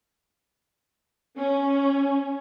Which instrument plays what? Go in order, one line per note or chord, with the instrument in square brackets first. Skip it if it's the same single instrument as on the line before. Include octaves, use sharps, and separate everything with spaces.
[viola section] C#4